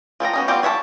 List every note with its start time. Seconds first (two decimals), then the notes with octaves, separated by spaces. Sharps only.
0.20 F3 A4 G5 A#5
0.33 B3 C#4 D#4
0.48 G3 B3 C4 F4 G4
0.63 C#5 E5 F#5 A5